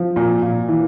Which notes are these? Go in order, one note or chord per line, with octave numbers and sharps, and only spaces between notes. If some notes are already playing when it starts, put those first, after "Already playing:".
Already playing: F3
A#2
A#2
E3